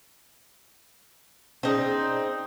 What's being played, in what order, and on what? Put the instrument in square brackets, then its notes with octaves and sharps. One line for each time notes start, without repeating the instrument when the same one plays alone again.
[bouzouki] C4 D#4 [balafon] C#4 G#4 D5